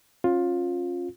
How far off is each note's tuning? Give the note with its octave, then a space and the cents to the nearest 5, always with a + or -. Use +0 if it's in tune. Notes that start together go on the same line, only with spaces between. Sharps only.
C#4 -25 F4 +15